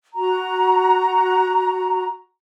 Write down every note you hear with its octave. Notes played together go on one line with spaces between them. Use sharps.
F#4 A#5